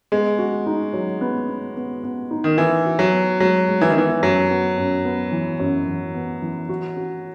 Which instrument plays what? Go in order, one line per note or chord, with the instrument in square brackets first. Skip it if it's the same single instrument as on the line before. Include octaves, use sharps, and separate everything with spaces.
[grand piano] G#3 [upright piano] B3
[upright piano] F#4
D#4
F#3
B3
B3
B3
B3
D#4
[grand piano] D#3
[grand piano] E3 [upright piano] D#4
[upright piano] F#4
[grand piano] F#3
[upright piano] B3
[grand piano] F#3 [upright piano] G#3
[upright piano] G#3
[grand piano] E3
D#3
[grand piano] E3 [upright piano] B3
[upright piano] F#2 [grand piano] F#3
[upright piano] B3
F#2
B3
E3
F#2
E3
B3
E3
F#4
F#4